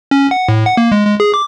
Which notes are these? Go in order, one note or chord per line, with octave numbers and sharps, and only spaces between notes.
C#4
F#5
A2
F#5
A#3
G#3
G#3
G#4
D6